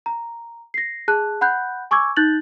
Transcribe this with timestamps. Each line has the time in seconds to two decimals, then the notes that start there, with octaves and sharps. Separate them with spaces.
0.06 A#5
0.74 A#6 C7
1.08 G#4 A5 F#6
1.41 F#5 B5 F#6 G6
1.91 G#5 C#6 D6 E6 G#6
2.16 D#4 F#6 G6 A6 F#7